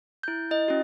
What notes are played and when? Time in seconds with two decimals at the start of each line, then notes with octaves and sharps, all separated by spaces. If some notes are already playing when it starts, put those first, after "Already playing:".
0.23 E4 G6
0.51 E4 D#5
0.68 C#4 F#4